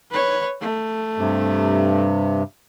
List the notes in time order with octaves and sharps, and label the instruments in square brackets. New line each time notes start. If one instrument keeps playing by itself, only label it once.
[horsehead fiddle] B4 C#5
A3
[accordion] G2 C3